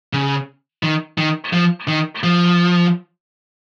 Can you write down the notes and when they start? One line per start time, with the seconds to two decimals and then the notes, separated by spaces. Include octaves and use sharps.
0.13 C#3
0.83 D#3
1.18 D#3
1.53 F3
1.88 D#3
2.23 F3